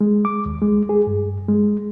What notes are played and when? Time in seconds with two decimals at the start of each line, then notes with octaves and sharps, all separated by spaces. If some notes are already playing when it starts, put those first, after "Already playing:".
0.01 G#3
0.25 D6
0.46 D#2
0.62 G#3
0.89 G#4
1.07 G2
1.48 G#3